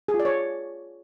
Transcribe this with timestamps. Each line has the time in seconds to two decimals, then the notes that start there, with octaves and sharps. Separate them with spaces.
0.08 G#4
0.14 F4
0.20 D5
0.25 C#5